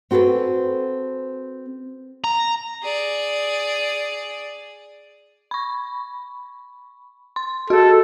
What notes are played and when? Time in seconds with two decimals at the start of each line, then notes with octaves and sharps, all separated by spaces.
0.11 C4 F#4 G#4 A4 B4
2.24 A#5
2.83 G#4 D5
5.51 B5 C#6
7.36 C6
7.70 F#4 G#4 A4